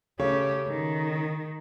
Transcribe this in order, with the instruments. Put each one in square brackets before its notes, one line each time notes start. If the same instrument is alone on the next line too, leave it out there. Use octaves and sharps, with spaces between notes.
[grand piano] C#3 A3 C#5 [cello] C#4 G4
[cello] D#3